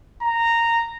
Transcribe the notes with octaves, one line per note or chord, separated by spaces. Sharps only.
A#5